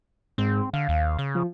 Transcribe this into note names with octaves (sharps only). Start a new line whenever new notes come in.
G#2 C4
D3 F5
D#2
C#3
F3